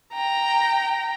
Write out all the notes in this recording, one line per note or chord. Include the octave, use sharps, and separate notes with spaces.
G5 A#5